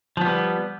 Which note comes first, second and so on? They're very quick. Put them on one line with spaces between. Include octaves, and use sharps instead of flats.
F3 B3 G3